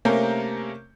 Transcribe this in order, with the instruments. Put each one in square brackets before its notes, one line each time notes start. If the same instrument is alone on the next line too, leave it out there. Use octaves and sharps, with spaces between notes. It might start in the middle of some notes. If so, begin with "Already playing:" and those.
[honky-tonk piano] C3 A3 A#3 C#4 A#4 G6